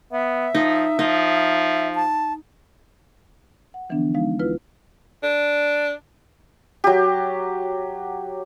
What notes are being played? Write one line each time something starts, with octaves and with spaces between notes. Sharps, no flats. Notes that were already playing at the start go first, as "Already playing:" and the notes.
B3 E5
F3 D#4
F3 D#4
A5
F#5
D3 E3 F3 B3 D4
F3 G#3 B3 D#4 F5
D2 E4 F4 B4 F6
D4
F#3 G4